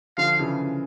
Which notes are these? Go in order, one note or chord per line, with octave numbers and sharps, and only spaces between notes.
D3 F3 F5
C#3 E3